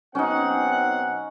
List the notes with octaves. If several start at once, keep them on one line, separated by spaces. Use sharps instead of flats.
B1 C4 C#4 D#4 F#5